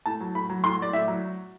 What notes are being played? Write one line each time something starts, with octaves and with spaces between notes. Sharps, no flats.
A2 A5
F#3
A2 B5
F#3
A2 C6
F#3 D5
A2 E5
F#3